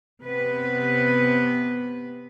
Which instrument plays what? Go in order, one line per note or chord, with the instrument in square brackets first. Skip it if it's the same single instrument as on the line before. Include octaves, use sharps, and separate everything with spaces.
[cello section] C3 B3 B4